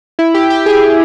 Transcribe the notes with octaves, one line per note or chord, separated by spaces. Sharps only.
E4
G4
G4
G#4